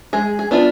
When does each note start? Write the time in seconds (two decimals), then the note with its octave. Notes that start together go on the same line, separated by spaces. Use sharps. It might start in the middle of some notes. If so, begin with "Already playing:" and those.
0.13 G#3 G#4
0.39 G#4
0.51 B3 D4 F4